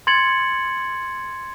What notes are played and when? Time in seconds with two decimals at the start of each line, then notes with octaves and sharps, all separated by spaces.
0.07 C6 G#6 A6 C#7 F#7